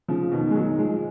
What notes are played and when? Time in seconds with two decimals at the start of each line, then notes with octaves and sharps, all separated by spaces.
0.08 C#3 F3
0.32 B2 D#3
0.51 G#3
0.55 D#3 F#3
0.78 F3 G#3